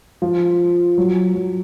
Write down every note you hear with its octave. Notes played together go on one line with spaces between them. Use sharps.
F3
F#3
F#3